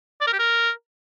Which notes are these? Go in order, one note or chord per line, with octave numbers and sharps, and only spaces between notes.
D5
A#4
G4
A#4